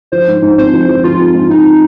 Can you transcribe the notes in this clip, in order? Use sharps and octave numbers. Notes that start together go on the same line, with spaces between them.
F3 C5
G#2
G#2
C4 C5
F3
F3
F3 F4
C4
G#2
C4 D#4